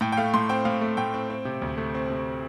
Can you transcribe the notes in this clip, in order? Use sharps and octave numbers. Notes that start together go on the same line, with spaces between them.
A2 G5
G5
A3 F5
A2 C6
C4 G5
A2 F5
A3
A2 G5
C4
C4
C3
D2
A3
C4
C3